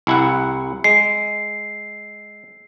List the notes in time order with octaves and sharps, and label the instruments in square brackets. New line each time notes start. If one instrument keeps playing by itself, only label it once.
[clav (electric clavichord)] C2 E4 F#5
[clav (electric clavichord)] G#3 [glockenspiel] C7